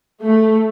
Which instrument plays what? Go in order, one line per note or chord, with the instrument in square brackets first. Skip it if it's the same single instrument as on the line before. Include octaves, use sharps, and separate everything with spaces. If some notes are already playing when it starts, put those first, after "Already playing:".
[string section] A3